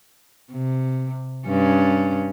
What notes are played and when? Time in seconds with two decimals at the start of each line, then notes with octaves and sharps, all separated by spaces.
0.52 C3
1.47 G2 C#4